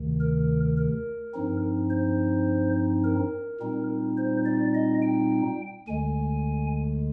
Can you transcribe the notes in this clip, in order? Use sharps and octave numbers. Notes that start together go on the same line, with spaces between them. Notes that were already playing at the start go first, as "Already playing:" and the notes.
Already playing: D2 C3 D#3
A#4
A#4
G2 F3 C4 D#4
C5
A#4
A#2 G3 C4 D#4
C5
D5
D#5
G5
D2 D3 G#3 G#5